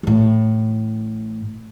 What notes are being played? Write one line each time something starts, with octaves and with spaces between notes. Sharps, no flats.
A1 A2